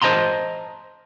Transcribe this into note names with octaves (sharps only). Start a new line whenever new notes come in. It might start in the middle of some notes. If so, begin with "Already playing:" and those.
C5 D#5 A5 A#5 C6